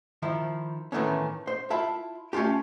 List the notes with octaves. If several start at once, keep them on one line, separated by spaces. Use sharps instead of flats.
D#3 F3 E4
A2 D#3 E3 A3 B3 C#4
C5
E4 F4 E5 A5 B5
A3 C#4 D4 F4 G4